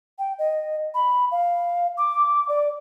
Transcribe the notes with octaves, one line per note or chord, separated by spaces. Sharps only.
G5
D#5
B5
F5
D6
D5